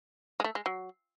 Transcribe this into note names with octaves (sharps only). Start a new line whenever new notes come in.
G#3
A3
G#3
F#3